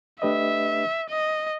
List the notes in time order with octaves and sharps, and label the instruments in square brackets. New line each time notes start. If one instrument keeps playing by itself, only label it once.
[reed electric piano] A3 D4 G4 B4 D#5 [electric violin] E5
[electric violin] D#5